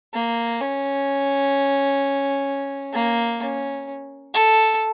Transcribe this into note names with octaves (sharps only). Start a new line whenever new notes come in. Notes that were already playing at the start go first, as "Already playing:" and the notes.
A#3
C#4
A#3
C#4
A4